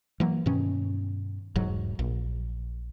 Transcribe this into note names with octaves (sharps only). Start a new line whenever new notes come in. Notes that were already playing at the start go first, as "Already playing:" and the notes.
E3 F#3 A#3
G2 B2 D#3 C#4
E1 G#2 F#3
A#1